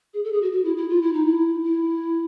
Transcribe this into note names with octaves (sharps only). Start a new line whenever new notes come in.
G#4
A4
G#4
F#4
F#4
E4
E4
F4
E4
D#4
E4
E4